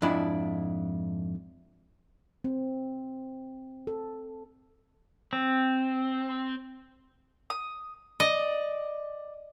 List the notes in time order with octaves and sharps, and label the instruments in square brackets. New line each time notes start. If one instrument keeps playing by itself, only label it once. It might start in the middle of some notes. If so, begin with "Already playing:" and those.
[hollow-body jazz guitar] F2 G#2 D4 E4 B5
[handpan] C4
A4
[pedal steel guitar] C4
[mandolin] D#6
[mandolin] D5 [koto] D#5